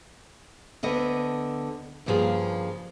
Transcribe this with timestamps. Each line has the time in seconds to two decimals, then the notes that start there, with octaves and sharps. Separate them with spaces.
0.83 D2 D3 B3 D#5
2.06 G2 C#3 F3 A#3 G#4